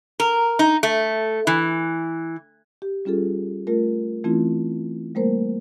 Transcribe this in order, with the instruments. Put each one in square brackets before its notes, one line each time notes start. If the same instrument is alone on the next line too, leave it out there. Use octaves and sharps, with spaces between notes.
[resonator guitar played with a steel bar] A#4
D#4
A3
E3
[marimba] G4
G3 C#4 F4 G#4 A4
A3 F4 A#4
E3 A3 C4 C#4 E4 F4
G3 A3 A#3 A#4 C5